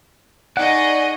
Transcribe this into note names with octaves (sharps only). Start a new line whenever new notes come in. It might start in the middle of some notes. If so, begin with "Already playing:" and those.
D#4 G#4 D5 D#5 F#5 C#6